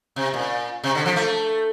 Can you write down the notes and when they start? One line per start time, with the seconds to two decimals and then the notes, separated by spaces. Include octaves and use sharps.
0.16 C3
0.34 A#2
0.84 C3
0.95 D3
1.06 F3
1.16 A3